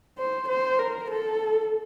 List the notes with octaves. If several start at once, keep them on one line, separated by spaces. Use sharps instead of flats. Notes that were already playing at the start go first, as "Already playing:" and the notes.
C5
C5
A#4
A4